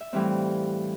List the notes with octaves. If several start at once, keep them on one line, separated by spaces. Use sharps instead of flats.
E5
A2 E3 G3 C4 F5